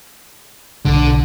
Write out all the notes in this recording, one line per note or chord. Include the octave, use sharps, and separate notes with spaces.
B1 D3